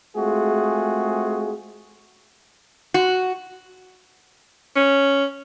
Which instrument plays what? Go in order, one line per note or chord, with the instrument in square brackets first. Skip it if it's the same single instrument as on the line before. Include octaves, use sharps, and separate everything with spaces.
[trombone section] G#3 A3 C4 F4 F#4 G#4
[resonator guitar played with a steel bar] F#4
[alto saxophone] C#4